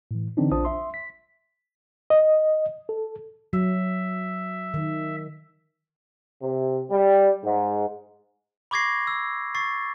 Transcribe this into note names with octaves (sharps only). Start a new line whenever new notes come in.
A2 E3
D3 E3 C4 D4 D#4
A#1 D4 F4 C5 A5 D#6
E5 C6
B6
D#5
A4
F#3 E5
D#3
C3
G3
G#2
B5 C#6 D6 G#6 A#6 C7
E6
C#6 A6 C7